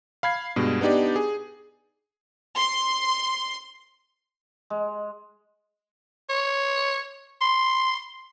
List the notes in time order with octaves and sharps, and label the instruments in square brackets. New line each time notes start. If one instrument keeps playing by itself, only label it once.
[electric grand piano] F5 B5 G#6 C7
G2 B2 G#3
B3 D4 D#4 G4 D5
G#4
[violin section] C6
[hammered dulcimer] G#3
[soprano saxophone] C#5
C6